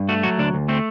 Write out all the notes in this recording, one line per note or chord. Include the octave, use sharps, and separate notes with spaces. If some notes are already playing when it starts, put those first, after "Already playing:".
Already playing: G2
A3 F#4
F#3 F#4
D2 D4
D2
A3 C4